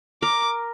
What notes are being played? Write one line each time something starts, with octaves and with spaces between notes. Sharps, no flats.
A#4 D6